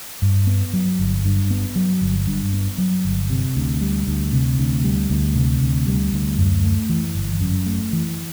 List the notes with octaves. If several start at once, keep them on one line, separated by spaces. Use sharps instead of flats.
G2
B3
F#3
G1
G2
B3
F#3
G1
G2
B3
F#3
G1
C3
D2
G3
D2
C3
D2
G3
D2
C3
D2
G3
D2
F#2
A3
E3
G1
F#2
A3
E3